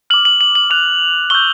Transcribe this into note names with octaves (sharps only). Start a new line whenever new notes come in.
D6 F6 F#7
F#7
F#7
F#7
D6 F#6 F7
C#6 E6 G6 G7